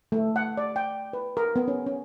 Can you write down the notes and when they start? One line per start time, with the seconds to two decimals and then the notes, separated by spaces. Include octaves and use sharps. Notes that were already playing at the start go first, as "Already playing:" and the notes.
0.12 A3
0.36 F#5
0.57 D5
0.76 G5
1.13 B4
1.37 A#4
1.56 B3
1.68 C#4
1.86 C#4